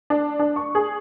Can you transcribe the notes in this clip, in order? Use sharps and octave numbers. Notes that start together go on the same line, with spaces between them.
D4
D4
C#6
G#4